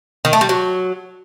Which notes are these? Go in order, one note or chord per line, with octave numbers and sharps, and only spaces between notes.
D#3
A3
G3
F#3